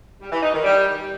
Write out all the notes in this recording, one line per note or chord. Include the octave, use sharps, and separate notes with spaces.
G3
E3
D#4
D#3
G3